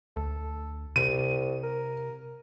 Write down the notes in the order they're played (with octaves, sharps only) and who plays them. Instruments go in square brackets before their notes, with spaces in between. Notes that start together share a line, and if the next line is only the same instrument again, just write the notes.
[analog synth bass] D2 [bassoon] A4
[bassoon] C2 [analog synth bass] C3 [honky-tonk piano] D#7
[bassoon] A#4